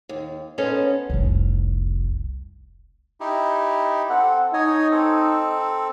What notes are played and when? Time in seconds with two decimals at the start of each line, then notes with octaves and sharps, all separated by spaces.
0.09 D#2
0.58 B3 C#4 D#4 A4 C5
1.10 F1 C2
3.21 D#4 E4 G4
4.10 C4 A4 F#5
4.54 D#4 C#5 D#5 G#5
4.91 C4 A4